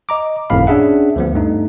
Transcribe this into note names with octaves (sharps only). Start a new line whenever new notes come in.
D#5 A#5 D6
G1 F2 A2 F5 B5
C#4 D4 G#4 E5 F#5
D2 F3 B3
G2 A3 D#4